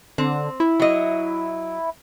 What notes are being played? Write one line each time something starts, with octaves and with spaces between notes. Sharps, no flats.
D3 C4
E4
F#3 D#5